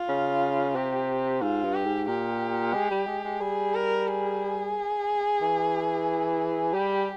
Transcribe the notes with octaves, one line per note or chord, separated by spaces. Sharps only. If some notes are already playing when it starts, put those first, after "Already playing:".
Already playing: F4
C#3
C3 G4
G#2 F4
G2
G4
G#2
A#2 G4
G#3
G3
G#3
G#3
G3 G#4
A#4
G#4
E3
G3 G4